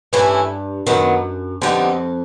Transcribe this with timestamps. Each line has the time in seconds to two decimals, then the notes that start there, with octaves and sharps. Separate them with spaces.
0.13 G2 E3 A3 C#4 E4
0.87 F#2 D#3 F#3 B3
1.61 F2 D3 G3 B3 D#4